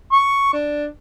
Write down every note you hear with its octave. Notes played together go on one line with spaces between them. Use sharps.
C#6
D4